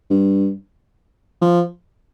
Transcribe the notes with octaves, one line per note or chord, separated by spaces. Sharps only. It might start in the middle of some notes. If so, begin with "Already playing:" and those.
G2
F3